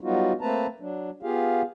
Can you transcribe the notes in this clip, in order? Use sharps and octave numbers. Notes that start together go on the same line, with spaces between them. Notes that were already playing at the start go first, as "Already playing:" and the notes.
F#3 G3 B3 D#4 F4 F#4
A3 A#3 C4 B4 A5 A#5
F#3 D4
B3 F4 G4 G#4 F5